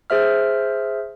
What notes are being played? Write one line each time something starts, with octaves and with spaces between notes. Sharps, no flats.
G#4 C5 E5 F6